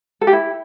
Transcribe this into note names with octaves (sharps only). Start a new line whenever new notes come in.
A4
G4
E4